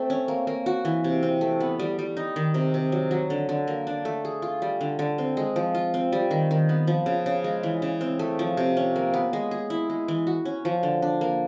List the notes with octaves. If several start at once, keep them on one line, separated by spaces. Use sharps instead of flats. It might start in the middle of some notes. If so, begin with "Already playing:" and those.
Already playing: A3 C4
C#4
A#3
A#3
F#4
E3
C3
C4
A3
B3
G3
G3
D#4
D#3
C3
C3
F#3
F#3
D3
D3
A#3
D4
A3
G#4
F4
G3
D3
D3
C4
G#3
F3
F4
C4
G3
D#3
D#3
B3
F3
C#3
C#3
G#3
E3
C#3
C4
A3
F3
C3
C#4
A#3
B3
G#3
G#4
E4
G#3
E3
F#4
C#4
F3
D3
D4
A#3